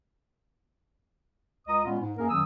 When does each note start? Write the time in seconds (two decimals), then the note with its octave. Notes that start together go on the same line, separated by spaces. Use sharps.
1.68 C#2 D#5 A#5 D#6
1.84 A#2 G#3 B3 C#4 F4
2.00 G#2
2.18 F#2 A#3 G#4 A#4
2.30 F#2 D#3 F#3 C#4 D#6 E6